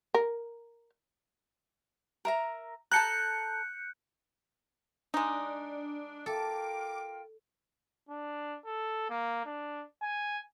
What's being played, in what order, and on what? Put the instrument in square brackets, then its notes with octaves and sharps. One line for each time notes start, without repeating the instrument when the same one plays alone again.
[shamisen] A#4
[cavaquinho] A#4 E5 A#5
[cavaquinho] A4 A5 A#5 [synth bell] F#6 G6 C#7
[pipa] G#3 D#4 [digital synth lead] D4
[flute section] F4 A#4 G5 [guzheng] A4 [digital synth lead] D6
[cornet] D4
A4
A#3
D4
G#5